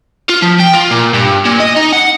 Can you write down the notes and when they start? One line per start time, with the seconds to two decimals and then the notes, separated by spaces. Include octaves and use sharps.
0.29 F4
0.42 F3
0.60 G5
0.73 F4
0.90 A#2
1.14 G2
1.45 A#2
1.60 D#5
1.76 D#4
1.92 F#5